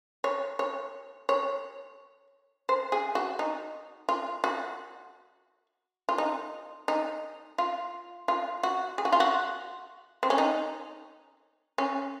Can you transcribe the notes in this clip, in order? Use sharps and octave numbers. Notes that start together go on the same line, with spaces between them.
C#5
C#5
C#5
C5
G#4
F#4
D#4
F4
F#4
F4
D#4
D#4
F4
F4
F#4
G#4
F#4
F4
F#4
C4
C#4
D#4
C#4